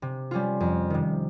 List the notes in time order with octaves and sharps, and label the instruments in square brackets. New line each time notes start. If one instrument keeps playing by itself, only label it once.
[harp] C3
G3 C#4 F4
F2
C3 D#3